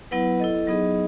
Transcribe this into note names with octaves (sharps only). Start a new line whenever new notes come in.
F#3 B3 E4 B4 F#5
E4 A4 D#5
F#3 B3 D#4 G#4 D#5